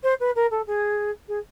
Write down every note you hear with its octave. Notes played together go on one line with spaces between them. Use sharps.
C5
B4
A#4
A4
G#4
G#4